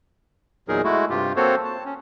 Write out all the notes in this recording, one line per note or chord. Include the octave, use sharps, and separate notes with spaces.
E2 A#2 F#3 D#4 G#4 A#4
G#3 A3 E4 F#4
G2 C3 F4 G4
A#3 C4 F#4 A4 C5 C#5
A5
C#4